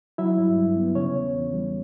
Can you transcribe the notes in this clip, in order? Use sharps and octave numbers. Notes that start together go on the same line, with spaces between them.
F#3 E4 E5
G2
G2
B3
C#3 C#4 C#5
E2
E2
G3